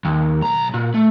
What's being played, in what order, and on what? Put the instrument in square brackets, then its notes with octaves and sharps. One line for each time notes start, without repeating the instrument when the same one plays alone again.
[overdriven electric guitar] D#2
B1 A#5
A#2
A3